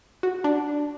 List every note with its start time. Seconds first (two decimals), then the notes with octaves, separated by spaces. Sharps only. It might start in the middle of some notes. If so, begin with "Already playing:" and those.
0.23 F#4
0.44 D4